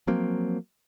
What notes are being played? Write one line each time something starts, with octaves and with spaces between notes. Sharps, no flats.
F3 F#3 A#3 C4